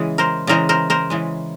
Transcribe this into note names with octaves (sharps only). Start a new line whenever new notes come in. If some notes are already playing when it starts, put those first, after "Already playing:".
Already playing: C#3 E3 G#3
A#4 C5
C#3 E3 G#3 A#4 C5
A#4 C5
A#4 C5
C#3 E3 G#3